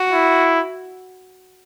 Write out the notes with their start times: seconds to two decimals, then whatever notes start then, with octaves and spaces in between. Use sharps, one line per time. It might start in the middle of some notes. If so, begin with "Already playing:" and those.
Already playing: F#4
0.12 E4